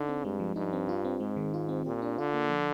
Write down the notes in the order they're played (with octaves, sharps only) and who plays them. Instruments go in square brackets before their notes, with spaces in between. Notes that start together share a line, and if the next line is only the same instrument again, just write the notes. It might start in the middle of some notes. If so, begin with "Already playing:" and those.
Already playing: [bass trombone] D3 [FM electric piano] D#4
[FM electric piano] C4
[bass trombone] G2 [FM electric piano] G#3
[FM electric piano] F3
[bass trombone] G2 [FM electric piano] D#4
[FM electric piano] C4
F4
C4
[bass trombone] G#2 [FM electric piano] G#3
[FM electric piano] D#3
F4
C4
[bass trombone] A#2 [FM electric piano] G4
[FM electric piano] D4
[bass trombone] D3 [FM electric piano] F4
[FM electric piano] A#3
F3